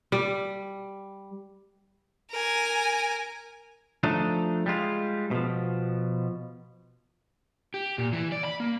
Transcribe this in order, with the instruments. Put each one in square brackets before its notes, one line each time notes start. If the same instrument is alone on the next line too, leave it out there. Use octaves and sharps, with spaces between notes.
[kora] G3
[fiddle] A#4 G#5
[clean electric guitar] F3 A3 D4 D#4
G3 G#3 F4
B2 F3
[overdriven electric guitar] G4
A#2
E3
D5
B5
A#3